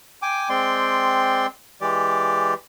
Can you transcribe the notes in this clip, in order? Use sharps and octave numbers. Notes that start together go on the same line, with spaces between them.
G5 G#5 D6
G#3 C4 D5 G5 C6
E3 G#3 G4 D5